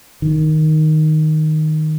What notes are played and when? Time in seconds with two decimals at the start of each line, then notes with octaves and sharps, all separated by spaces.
0.22 D#3